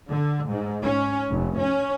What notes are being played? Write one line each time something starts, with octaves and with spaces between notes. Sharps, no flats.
D3
G#2
C#4
F1
C#4